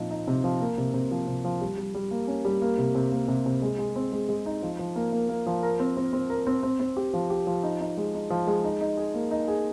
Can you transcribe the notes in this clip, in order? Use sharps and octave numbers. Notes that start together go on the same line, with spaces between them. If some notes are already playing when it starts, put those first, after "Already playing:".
Already playing: A#2 F3 C4 D#4
D#4
C3
F3
A#3
C3
C3
F3
C3
F3
G3
G3
G3
A#3
C#4
G3
A#3
C3
C3
A#3
C3
C3
G#3
G#3
C4
G#3
G#3
D#4
F3
F3
A#3
A#3
A#3
F3
A#4
C4
C4
C4
A#4
C4
C4
C4
G4
F3
G4
F3
D#4
D#4
G#3
D#4
F3
G#3
D#4
D#4
G#4
A#3
D#4
G#4